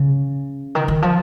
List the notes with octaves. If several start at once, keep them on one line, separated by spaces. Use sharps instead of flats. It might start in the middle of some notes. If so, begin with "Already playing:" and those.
Already playing: C#3
D#3
D#3
F3